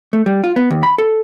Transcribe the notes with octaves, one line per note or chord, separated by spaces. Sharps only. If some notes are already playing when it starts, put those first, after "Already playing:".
A3
G3
F4
B3
D#2
B5
A4